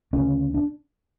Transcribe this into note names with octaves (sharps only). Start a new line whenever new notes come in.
D2 C#3 C#4
D4